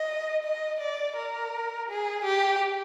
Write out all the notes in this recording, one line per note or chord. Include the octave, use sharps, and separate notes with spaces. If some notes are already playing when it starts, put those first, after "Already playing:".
Already playing: D#5
D#5
D5
A#4
G#4
G4